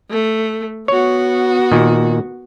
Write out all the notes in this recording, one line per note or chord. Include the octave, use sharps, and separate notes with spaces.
A3
B3 F#4 C#5
A#2 D#3